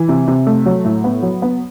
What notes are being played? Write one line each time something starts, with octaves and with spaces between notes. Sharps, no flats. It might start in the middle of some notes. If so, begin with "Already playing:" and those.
Already playing: E3
C3
C3
A3
F#3
A2
B3
F#3
B3